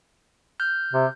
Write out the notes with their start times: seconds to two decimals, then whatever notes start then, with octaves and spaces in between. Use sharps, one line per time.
0.60 F6 G6
0.93 C3